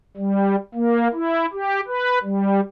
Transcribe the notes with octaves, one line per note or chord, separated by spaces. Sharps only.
G3
A#3
E4
G4
B4
G3